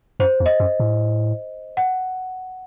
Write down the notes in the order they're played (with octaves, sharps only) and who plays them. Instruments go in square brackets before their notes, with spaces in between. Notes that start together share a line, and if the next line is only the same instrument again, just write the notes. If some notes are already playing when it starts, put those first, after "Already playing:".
[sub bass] F#2 [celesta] C5
[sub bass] E2
[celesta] D#5
[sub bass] F#2
A2
[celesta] F#5